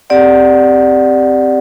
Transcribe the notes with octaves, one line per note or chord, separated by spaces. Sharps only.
C4 G4 D5 F#5